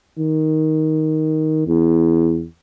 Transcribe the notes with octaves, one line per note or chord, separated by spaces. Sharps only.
D#3
E2